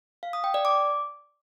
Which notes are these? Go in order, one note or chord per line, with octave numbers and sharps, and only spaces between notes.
F5
D#6
G5
D5
D6